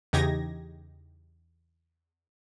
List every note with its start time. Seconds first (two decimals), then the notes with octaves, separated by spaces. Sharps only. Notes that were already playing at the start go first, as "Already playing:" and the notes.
0.13 E2 C#3 D#4 G4 G#6 A#6